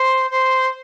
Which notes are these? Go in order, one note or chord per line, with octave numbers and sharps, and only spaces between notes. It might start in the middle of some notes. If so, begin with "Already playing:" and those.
Already playing: C5
C5